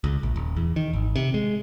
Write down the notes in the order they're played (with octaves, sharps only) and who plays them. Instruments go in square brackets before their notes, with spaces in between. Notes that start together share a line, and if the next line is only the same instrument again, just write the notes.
[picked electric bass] C#2
A#1
D#1
E2
D#3
G#1
C3
G#3